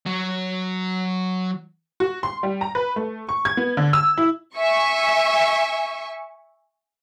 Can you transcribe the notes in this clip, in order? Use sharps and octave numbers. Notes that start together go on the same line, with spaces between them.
F#3 F#4
F#4
C6
G3
A#5
B4
A3
C#6
G#6
B3
D3
E6
E4
E5 G#5 C#6